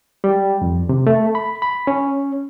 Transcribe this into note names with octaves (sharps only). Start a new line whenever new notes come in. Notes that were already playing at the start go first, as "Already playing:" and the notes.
G3
F2
C3
A3
B5
B5
C#4